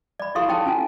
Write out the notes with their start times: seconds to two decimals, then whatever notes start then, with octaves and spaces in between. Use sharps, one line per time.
0.20 D5 B5
0.35 E4 F4 G4 A4 F5 C6
0.49 D#4 C#5 G5 A5
0.66 C#4 F4 G#5